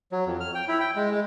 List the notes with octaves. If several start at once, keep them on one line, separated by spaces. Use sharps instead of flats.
F#3
F2
F6
G5
E4
G5
G#3
G#3